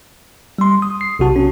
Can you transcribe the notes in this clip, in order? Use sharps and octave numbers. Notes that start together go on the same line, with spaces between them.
G3 C6
D#6
C7
B1 C3 F#4 A5
C#4